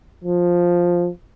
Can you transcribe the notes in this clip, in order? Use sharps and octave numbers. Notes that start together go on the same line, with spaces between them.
F3